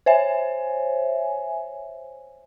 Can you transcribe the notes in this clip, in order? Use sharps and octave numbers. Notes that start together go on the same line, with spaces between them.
C5 C#5 E5 G#5